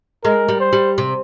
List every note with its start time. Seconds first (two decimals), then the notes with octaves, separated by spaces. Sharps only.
0.24 G#3 A#4
0.49 G3
0.60 C5
0.73 G3
0.98 C3